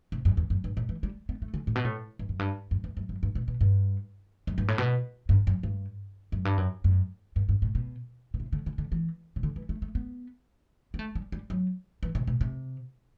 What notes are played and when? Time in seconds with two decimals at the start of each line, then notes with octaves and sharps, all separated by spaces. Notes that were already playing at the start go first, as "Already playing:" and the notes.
0.12 C3
0.25 F#2
0.37 E2
0.50 F#2
0.64 G2
0.77 A2
0.89 E3
1.03 G3
1.29 B3
1.42 A3
1.54 D3
1.67 A2
1.75 B2
1.85 A2
2.19 G2
2.29 F#2
2.39 G2
2.71 F#2
2.84 E2
2.97 F#2
3.09 F#2
3.23 G2
3.35 B2
3.48 B2
3.61 G2
4.47 F#2
4.58 G2
4.68 A2
4.78 B2
5.29 G2
5.47 F#2
5.63 G2
6.32 F#2
6.45 G2
6.57 F#2
6.84 F#2
7.36 G2
7.49 G2
7.62 A2
7.75 B2
8.34 B2
8.40 C3
8.53 D3
8.66 D3
8.78 D3
8.92 E3
9.36 C3
9.43 D3
9.56 E3
9.69 A3
9.82 A3
9.95 B3
10.94 B3
10.99 A3
11.15 G3
11.32 G3
11.50 F#3
12.03 E3
12.15 C3
12.27 B2
12.41 C3